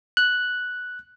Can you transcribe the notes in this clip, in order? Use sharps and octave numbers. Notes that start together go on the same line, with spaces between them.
F#6